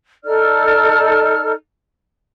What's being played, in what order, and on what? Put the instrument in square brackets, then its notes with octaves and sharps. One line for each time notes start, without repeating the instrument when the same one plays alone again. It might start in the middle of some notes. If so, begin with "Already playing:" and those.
[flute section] D#4 A4 D5 F6